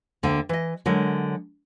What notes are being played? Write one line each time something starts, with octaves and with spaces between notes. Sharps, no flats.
D2 D3 A#3 D5 G5
E3 D#5
D3 F#3 G#3 A#4